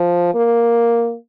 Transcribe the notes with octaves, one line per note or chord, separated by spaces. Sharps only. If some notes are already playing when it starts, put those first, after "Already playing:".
Already playing: F3
A#3